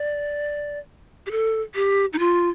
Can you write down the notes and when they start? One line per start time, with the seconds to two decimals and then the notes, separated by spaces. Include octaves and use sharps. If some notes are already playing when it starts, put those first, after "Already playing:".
Already playing: D5
1.26 G4
1.31 A4
1.75 G4
2.13 D#4
2.19 F4